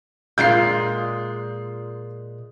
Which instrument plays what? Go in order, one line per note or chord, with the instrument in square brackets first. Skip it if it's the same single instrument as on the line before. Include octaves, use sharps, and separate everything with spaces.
[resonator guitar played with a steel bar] A#2 G#3 F4 [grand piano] G6 C7